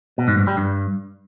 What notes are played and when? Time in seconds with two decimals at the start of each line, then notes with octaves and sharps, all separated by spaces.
0.18 B2
0.28 G#2
0.38 G2
0.47 G3
0.57 G2